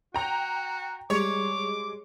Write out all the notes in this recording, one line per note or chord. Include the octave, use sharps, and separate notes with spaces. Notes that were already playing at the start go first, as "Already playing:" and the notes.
F#4 G5 A#5
G3 G#3 C#5 D6